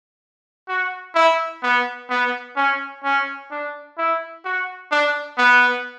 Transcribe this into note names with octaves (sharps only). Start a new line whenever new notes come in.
F#4
E4
B3
B3
C#4
C#4
D4
E4
F#4
D4
B3